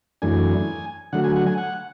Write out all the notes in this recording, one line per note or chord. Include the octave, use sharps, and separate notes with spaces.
F#2 E3 A3 D4 G#5
D3 F#3 A3 F#5
G#5
F#5
G#5
F#5